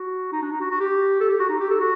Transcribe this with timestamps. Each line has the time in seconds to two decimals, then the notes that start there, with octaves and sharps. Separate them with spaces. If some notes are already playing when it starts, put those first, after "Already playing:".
Already playing: F#4
0.32 D#4
0.42 D4
0.52 D#4
0.61 F#4
0.71 F#4
0.80 G4
1.20 A4
1.30 G4
1.39 F#4
1.49 D#4
1.60 G4
1.70 A4
1.80 F#4